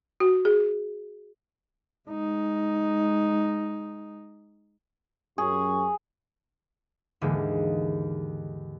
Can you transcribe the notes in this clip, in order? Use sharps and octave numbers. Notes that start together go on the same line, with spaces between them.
F#4
G#4
G#3 D#4
F#2 G#4 C#6
D#2 G#2 D3 E3 G#3 A#3